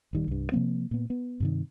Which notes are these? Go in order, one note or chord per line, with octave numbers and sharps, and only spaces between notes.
D#1 D#3 G3
C2 G2
C3 F3 A#3 C4
A#2 B3
B3
G2 C3 D#3